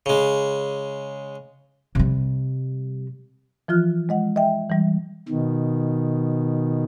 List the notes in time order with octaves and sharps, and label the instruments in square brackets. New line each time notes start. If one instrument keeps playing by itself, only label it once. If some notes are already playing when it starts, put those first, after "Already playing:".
[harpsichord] C#3 G#3
[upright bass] C3 G3
[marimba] E3 F3 F4 F6 F#6
G#3 D#5 F#5
D#5 E5 G5
E3 G3
[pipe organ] B2 D#3